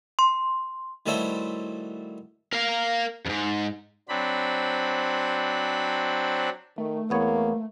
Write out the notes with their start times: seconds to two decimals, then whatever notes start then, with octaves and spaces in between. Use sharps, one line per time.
0.19 C6
1.06 D#3 F#3 G3 A3 E4 C5
2.53 A#4 F5
3.26 F2 G#2
4.09 F#3 C4 D4 B5
6.78 D#3 A3
7.10 E2 A#3 B3 C#5